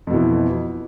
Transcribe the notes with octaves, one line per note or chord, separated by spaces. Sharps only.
F2 B2 E3